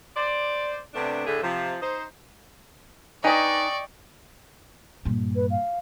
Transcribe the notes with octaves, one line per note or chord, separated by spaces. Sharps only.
C5 D5
C3 A3 B3 D4
A2 D3 A3 G#4 E5
C3 F3
D#4 C5
D#4 B4 D5 D#5 G5 G#5 C#6
G2 A#2
B4
F5